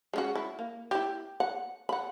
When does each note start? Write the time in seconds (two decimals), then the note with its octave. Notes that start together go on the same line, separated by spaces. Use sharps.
0.13 G#3 C#4 F#4
0.35 E4
0.59 A#3
0.91 E4 G4
1.40 F#5
1.89 F#5 B5